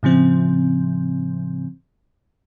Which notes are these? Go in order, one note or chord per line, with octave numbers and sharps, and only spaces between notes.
A2 C#3 F3 C4